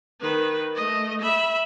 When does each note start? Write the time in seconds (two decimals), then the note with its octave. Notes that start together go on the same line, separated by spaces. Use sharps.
0.21 D#3 B4
0.76 A3 D#5
1.21 E5 B5